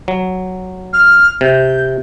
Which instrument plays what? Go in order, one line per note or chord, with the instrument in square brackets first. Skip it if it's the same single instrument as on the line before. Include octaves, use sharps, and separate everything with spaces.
[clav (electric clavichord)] F#3
[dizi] F6
[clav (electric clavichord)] C3 [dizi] G6